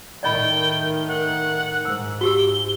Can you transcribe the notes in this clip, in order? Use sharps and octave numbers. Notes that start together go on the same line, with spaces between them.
A2 D#3 D5 D#5 G5 B5
F#5
G#2 E6
F#4 G4 E6 G7